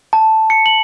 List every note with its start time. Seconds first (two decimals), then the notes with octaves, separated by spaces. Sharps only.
0.13 A5
0.50 C#7
0.66 F#7